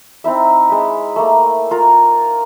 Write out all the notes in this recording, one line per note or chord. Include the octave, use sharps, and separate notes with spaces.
C4 D#4 E4 E5
G#3 B5
A3 A#3
F4 A#4